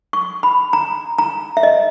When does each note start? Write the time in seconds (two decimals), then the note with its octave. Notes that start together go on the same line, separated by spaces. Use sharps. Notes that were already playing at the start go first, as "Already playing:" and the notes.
0.13 C#6
0.43 B5
0.73 A#5
1.18 A#5
1.57 E5
1.63 D#5